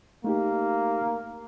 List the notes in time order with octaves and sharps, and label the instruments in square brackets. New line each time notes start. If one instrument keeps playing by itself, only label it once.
[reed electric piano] A3 D#4 G4 [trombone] A#3